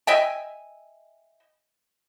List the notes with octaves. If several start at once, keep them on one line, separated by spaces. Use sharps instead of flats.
D#5 E5 G5 G#5